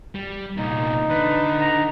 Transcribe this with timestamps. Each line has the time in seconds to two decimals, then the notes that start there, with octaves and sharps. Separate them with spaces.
0.15 G3
0.57 C2 A#2 D#4
1.10 D3 B4
1.61 A#5